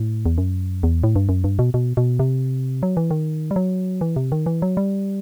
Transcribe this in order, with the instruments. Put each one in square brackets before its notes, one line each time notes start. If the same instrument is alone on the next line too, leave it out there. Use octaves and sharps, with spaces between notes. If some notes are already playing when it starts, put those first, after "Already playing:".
Already playing: [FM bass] A2
E2
F#2
E2
A2
G2
F#2
G2
B2
B2
B2
C3
F#3
E3
D#3
G3
F#3
E3
C3
D#3
E3
F#3
G3